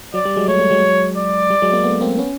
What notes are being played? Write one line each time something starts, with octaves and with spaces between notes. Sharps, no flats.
F#3 D5
G3
F#3 G#3
G3 A3 C#5
G3 A3
F#3 G#3
D5
G3
F#3 G#3
G#3 A#3
A3 B3
A#3 C4
B3 C#4